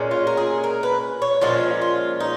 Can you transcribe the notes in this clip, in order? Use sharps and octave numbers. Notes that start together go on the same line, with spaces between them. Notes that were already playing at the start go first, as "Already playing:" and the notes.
Already playing: A#2 G#3 C#4
F4
A#4
G#4
A#4
B4
C#5
A#2 F3 G#3 C#4 F4
F4
D#4